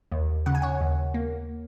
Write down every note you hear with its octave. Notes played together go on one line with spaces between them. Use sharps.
D#2
C#3 F#5
G#5
C#5 F#5
D#2
A#3